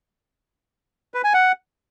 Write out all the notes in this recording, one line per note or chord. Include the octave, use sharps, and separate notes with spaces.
B4
G#5
F#5